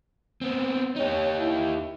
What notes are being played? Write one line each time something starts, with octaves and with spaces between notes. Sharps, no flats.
B3 C4
D#4 G4 C#5
E4